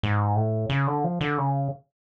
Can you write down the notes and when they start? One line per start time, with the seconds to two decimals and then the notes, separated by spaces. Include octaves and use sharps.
0.03 G#2
0.36 A2
0.69 C#3
0.87 D3
1.04 F3
1.21 D3
1.38 C#3